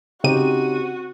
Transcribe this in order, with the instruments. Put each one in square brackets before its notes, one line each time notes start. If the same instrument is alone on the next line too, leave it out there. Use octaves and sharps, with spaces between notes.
[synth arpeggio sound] C#3 D#7 [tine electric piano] C4 D#4 G4 [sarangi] F#4